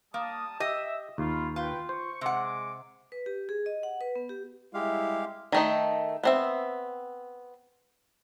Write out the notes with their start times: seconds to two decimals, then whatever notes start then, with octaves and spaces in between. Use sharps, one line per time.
0.14 G3 A#3 A5 D#6
0.60 G4 D#5 E5
1.18 D#2 F4 B5
1.56 F4 B4 G5
1.89 C5 C#6
2.21 C3 G#3 F#5 D6
3.12 B4
3.26 G4
3.49 G#4
3.66 D#5
3.83 F#5
4.01 B4
4.16 B3
4.29 G4
4.74 G3 G#3 E4 G4 F5
5.52 D#3 A3 D#4
6.23 B3 C4 E5